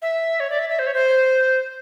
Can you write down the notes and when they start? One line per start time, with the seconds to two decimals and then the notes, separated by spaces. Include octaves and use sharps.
0.02 E5
0.40 C#5
0.50 D5
0.59 E5
0.70 E5
0.79 C5
0.87 C#5
0.94 C5